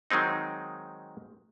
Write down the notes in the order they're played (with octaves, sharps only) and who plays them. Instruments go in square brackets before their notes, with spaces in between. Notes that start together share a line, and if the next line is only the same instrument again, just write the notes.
[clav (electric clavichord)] D#3 F#3 G#3 C4 D#4